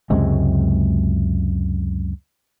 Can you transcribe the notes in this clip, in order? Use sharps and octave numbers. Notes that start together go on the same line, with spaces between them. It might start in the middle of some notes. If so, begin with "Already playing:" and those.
C#2 F#2 C3 G#3